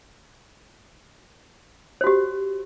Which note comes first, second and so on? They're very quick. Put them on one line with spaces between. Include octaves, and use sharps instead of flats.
C5 F#4 G4